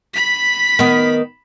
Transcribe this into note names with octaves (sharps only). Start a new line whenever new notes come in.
B5 B6
D#3 B3